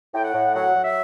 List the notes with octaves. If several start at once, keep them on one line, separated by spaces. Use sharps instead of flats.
A2 G5
F#5
A2
F#3 F#5
F#3
E5